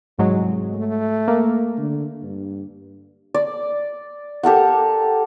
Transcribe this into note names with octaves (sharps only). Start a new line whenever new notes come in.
C2 G#2 F#3 G#3
A3
A#3
D3
G2
D5
G4 A4 A#4 F#5